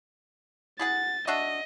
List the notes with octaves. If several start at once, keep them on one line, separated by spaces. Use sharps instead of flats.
E4 G#4 F#5 A6
D4 F#4 D#5 E5